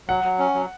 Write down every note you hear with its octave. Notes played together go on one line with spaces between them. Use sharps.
F#3 F#5
F#3
C#4
F#3